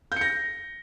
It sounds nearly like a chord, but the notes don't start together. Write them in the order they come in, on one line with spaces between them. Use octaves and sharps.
G6 C#7 A#6